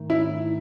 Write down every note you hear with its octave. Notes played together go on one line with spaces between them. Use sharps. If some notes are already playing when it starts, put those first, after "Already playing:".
Already playing: G#2 D#3 A3 D#4
E4